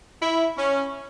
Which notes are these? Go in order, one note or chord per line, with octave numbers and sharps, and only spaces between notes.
E4
C#4